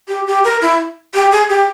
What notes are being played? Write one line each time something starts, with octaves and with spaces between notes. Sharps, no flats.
G4
G4
A#4
E4
G4
G#4
G4